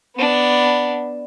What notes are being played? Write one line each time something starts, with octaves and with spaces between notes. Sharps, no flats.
B3 D4